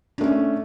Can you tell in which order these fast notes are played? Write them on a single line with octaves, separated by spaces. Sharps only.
D4 A3 C#4